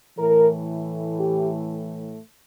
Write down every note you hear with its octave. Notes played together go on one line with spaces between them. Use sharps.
A2 E3 A3 A#4
G4